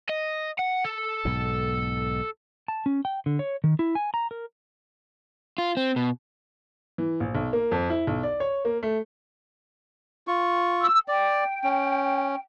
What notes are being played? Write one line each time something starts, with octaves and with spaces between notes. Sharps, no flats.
D#5
F#5
A4
B1 G#2 B2
A5
C#4
G5
D3
C#5
D#3
E4
G#5
A#5
A#4
F4
C4
B2
E3
A#1
B1
A#3
F2
E4
B1
D5
C#5
A#3
A3
F4 C#6
E6
D5 G5
C#4